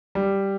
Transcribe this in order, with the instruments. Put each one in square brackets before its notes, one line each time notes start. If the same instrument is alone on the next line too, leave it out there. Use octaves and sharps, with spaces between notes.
[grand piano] G3